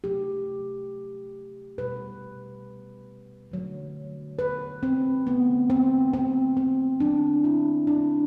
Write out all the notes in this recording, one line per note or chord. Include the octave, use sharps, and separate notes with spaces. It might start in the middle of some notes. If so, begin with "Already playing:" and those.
C3 F#3 A3 G4
B2 G3 B4
D3 F#3 A3
B4
C4
D3 A3 B3
C4
C4
C4
D3 F#3 A3 D4
E4
D4